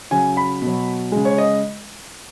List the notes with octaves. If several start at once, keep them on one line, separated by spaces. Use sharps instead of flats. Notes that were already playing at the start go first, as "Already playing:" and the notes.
C#3 F#3 G#5
B5
B2 F#3
C#3 G#3
C#5
D#5